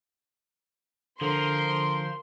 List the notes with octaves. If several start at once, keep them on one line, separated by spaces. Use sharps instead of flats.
D3 F3 A#4 C6